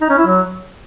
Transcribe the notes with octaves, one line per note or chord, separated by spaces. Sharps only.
D#4
C#4
E4
F#3